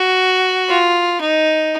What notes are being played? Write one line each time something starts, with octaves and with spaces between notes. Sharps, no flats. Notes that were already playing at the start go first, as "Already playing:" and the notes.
Already playing: F#4
F4
D#4